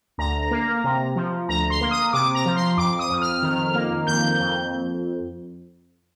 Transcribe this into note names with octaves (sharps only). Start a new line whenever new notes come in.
D2 A#5
A#3
C3
F3
D2 A#5
C6
A#3
D#6
C3 D6
A#5
F3
C6
F2 D6
D#6
F2
F6
D#3
A#3
F2 G6
F2